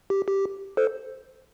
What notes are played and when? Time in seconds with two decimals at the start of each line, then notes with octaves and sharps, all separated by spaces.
0.10 G4
0.28 G4
0.77 A4 C5